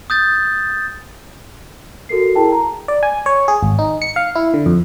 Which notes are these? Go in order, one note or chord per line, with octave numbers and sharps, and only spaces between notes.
D#6 G6 A6
F#4 A4 A#4 C7
E4 G#4 A#4 G5 A5
A#5
D5
G#5
C#5
G#4
G#1
D#4
C#7
F5
E4
D3
F2